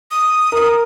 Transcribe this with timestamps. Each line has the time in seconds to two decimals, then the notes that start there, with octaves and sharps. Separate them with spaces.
0.11 D#6
0.52 A#4